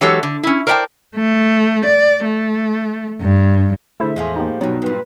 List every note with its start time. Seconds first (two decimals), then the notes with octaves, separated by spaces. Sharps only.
0.01 E3 F#3 G#3 G4 A4 C#5
0.23 D3
0.43 C#4 E4
0.67 A#4 C5 D5 D#5 G5 A5
1.16 A3
1.85 D5
2.24 A3
3.21 G2
4.00 D3 A3 E4 G#4 A4 C5 E5
4.16 E2 A2 F3 G#3 G#5
4.36 A#3 D#4 G4
4.61 G2 B2 F#3 B3 D#4 F#4
4.82 G2 A#2 B4